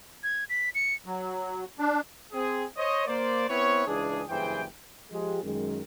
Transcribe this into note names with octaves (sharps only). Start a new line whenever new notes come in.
G#6
B6
C#7
F#3
D4
C4 G#4
C5 C#5 D#5
A#3 C5 D5
B3 C4 E4 B4 C#5
C#2 E3 D4 G#4
F#1 G2 E3 G#4 C5 G5
F3 G#3 G4
F#2 D#3 G#3